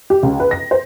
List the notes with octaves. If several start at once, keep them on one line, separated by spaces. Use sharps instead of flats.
G4
C#2
B4
A#6
C5